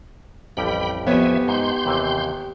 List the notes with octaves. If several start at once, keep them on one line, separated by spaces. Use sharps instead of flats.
A1 F2 G3 G5 B5
F3 B3 G4 C#5 E5 G#5
G#2 C6 G6
D#2 C3 E3